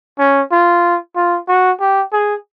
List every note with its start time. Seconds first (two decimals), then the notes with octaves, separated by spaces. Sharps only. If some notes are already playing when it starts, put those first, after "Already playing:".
0.19 C#4
0.52 F4
1.16 F4
1.48 F#4
1.80 G4
2.13 G#4